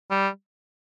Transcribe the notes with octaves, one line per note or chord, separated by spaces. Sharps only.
G3